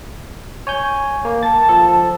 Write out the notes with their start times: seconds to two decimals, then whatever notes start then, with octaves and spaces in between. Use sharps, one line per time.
0.67 C#5 G#5 G6
1.25 A#3
1.43 A5 A6
1.69 F3 A4